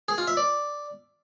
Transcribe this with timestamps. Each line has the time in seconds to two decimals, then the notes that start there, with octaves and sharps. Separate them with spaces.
0.08 G#4
0.18 F4
0.28 E5
0.37 D5